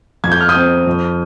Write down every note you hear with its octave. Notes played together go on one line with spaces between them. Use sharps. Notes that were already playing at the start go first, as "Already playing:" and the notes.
F2 G#6
G6
F6
D#6 G6
C4
F2